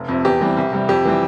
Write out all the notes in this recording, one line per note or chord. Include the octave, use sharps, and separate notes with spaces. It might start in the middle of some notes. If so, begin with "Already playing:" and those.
Already playing: F1
F2 C3
E2 G4
E3 G3 C4
C2
C3 G3
F2 G4
E3 G3 C4